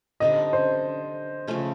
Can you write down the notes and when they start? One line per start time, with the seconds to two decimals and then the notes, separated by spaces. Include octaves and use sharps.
0.20 D3 G3 C4 D#4 D#5
0.53 C5
1.47 C#3 F3 A3 C#4